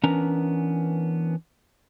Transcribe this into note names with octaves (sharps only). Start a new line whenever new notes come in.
E3 B3 C#4 D4 A#4 A#5